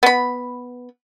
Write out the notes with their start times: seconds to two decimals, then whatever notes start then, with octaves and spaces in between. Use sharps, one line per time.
0.03 B3 B5